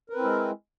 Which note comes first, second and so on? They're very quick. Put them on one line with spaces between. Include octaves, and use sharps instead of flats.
A#4 B4 C4 E4 G#3